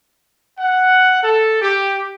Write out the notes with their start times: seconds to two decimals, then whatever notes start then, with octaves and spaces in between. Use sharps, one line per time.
0.59 F#5
1.24 A4
1.62 G4